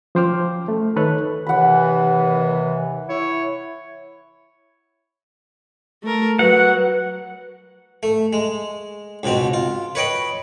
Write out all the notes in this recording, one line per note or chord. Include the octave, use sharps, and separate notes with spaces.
F3 C#4 C5 G5 D6 F6
A3
D#3 D#4 A4 B4 C#5 F#6
D#2 C3 E3 F#5 B5
E4 C#5
A3 A#4
F#3 B4 F#5
A3
G#3
C#2 G#2 B2 C4
F4
B4 C#5 D#5 G5 B5